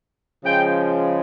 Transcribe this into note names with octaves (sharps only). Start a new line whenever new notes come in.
C#3 F3 G#3 G5